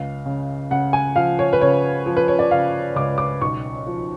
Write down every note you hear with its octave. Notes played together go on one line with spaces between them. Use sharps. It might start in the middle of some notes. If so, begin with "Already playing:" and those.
Already playing: C#2 F5
C#3
C#3 F#5
G#5
F3 F5
C#5
B4
C#3 C#5
F3
B4
C#5
D5
C#3 F5
C#2 D6
D6
B1 C#6
F3